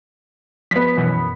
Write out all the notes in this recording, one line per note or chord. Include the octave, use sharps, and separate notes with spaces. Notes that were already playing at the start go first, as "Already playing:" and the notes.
F3 B3 B6
F#2 B2 E3